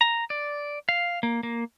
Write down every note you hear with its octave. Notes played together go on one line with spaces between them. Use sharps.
A#5
D5
F5
A#3
A#3